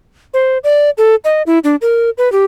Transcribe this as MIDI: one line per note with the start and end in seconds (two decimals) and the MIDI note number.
0.34 0.58 72
0.64 0.90 74
0.98 1.15 69
1.24 1.42 75
1.47 1.59 64
1.64 1.76 62
1.82 2.10 70
2.18 2.31 71
2.32 2.45 67